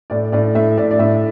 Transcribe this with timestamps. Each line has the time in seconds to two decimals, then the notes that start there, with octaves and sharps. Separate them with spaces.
0.10 A2 D5
0.32 A2 D5
0.55 A2 E5
0.78 A2 D5
0.91 D5
0.99 A2 E5